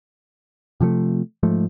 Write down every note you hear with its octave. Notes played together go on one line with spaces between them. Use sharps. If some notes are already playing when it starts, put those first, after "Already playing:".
C3 F3 F#3 A3
G#2 F3 A3